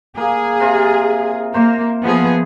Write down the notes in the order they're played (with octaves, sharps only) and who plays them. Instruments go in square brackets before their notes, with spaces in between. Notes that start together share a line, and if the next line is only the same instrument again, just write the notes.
[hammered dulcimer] A#3 [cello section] G#4
[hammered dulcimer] C3 F4
[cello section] A#3 [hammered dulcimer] C5
[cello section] F3 B3 G#4